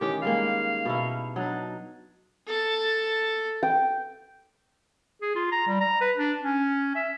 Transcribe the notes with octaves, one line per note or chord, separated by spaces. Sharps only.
D#3 E3 C#4 G4
G3 G#3 A#3 F5
B2 D#4 E4
F#3 D4 D#4
A4 A5
G5
G#4
F4
A#5
G3
A#5
B4
D4
C#4
E5